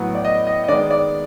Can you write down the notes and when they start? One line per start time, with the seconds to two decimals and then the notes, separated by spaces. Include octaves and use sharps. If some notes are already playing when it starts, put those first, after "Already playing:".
Already playing: A2 F#3 B3
0.15 D5
0.25 D#5
0.47 D#5
0.64 D#5
0.68 D#3 G#3 B3 D5
0.91 D5